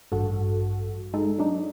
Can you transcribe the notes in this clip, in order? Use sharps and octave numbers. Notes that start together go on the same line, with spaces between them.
A1 G2 F#4 A4
G#3 D#4 A4
F#3 D4 D#4